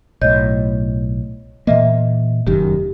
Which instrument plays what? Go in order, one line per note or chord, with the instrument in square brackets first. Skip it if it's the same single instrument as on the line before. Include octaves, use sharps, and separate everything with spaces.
[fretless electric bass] B1 A2 [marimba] C#5 D#5 G6
[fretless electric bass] A#2 E3 A#3 [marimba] D#5 E5
[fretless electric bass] F1 F#2 D#3 [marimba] G4